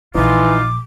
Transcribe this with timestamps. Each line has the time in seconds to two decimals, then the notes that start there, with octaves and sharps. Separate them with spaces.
0.15 A#1 E3 D#4 F4 D6